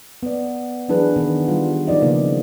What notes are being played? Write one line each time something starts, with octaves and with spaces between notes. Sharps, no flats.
B3 D5
E3 F#3 D4 E4 G#4 B4
D#3 B3
G3 D4 F4
F3 D#4 D5 D#5
C#3 A#3 B3